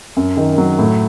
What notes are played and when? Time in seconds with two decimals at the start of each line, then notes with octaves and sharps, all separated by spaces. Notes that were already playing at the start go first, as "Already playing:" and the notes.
0.17 F#2
0.37 D#3
0.58 F#3
0.79 A2